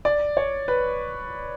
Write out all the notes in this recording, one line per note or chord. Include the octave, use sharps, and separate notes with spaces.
D5
C#5
B4